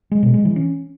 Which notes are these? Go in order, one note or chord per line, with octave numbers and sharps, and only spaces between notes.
G#3
B2
G#3
E3
C#4